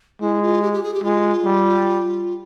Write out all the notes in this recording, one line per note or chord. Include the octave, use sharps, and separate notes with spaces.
G#3 E4
F4
G4
G4
G#4
G4
G#3 F4
G3